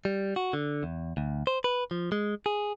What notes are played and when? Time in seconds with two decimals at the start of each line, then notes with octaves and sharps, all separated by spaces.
0.05 G3
0.36 F#4
0.53 D3
0.83 E2
1.17 D2
1.47 C5
1.64 B4
1.91 F3
2.12 G#3
2.46 G#4